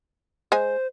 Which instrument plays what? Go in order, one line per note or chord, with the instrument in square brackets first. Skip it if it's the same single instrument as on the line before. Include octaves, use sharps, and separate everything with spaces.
[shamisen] G#3 G#5 [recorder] C5